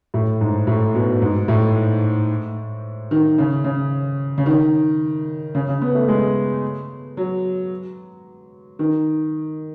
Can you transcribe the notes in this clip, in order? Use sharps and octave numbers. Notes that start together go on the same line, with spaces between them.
A2
G#2
A2
B2
G#2
A2
D#3
C#3
C#3
C#3
D#3
C#3
C#3
B3
A3
G#3
F#3
D#3